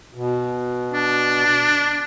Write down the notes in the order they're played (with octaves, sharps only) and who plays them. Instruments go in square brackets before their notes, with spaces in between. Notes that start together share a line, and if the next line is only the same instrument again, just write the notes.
[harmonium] B2
[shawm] D4